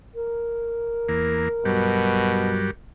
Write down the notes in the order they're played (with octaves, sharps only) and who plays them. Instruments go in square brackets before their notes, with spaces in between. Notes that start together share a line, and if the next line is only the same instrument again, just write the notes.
[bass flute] A#4
[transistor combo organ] E2 A#3
[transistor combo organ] G2 F#3 G3 [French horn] B2